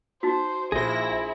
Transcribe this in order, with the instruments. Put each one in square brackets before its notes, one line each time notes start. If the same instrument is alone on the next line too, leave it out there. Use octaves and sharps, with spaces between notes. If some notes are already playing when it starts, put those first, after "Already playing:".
[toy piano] D#4 F#4 [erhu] C5
[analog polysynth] A#1 A#6 [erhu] E4 [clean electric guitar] G#4 C5